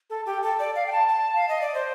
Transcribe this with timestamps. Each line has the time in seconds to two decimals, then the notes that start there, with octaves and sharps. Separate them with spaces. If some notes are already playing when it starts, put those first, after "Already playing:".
0.10 A4
0.26 G4
0.43 A4
0.59 D5
0.75 F5
0.86 G5
0.92 A5
1.08 A5
1.36 F5
1.49 D#5
1.61 D5
1.74 C5